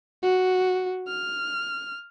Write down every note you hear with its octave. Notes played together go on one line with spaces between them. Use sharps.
F#4
F6